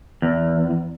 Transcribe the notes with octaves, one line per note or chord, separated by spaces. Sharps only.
E2